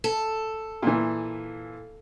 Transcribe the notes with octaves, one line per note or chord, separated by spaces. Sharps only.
A4
A#2 E3